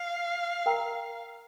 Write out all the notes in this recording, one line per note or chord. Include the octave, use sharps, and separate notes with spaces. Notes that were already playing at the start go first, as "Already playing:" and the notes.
Already playing: F5
A#4 G5 A#5